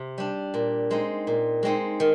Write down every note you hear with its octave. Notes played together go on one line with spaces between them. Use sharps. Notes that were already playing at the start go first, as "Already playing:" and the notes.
Already playing: C3
G3 D4
A#2
G#3 C4 D#4
A#2
G#3 C4 D#4
D#3